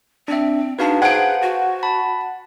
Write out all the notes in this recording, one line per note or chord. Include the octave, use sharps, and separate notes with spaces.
C4 D4 E5
D4 D#4 F#4 G#4 B4 F5 A5
G#4 C5 F#5 G#5 G#6 D7
F#4
A5 B5